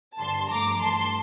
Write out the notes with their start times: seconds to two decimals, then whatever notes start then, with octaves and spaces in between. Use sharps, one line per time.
0.18 G2 D3 G3 A5 C6
0.50 G2 F3 A3 A#5 D6
0.82 G2 E3 A3 A5 C6